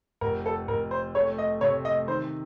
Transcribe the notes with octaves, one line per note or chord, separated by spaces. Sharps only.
F1 A#4
A4
F1 A#4
C5
A3 C#5
D#5
C3 C#5
D#5
D#3 C5